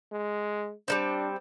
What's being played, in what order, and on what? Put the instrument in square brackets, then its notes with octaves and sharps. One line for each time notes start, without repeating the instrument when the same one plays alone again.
[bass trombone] G#3
[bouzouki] G3 A#3 C4 [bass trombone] D4